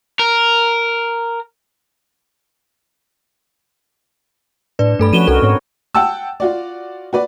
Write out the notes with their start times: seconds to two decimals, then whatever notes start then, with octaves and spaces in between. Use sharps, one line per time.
0.19 A#4
4.79 A2 D4 B4 D5
4.99 G2 A3 A4 B5
5.13 F3 C#4 F#4 B4 D#7 E7 G7
5.27 C2 D#4 F#4 A4 A#4
5.42 G#2 B3 C4 C#5
5.94 F#5 G5 A5 E6
6.40 F4 F#4 D5
7.13 F#4 B4 D5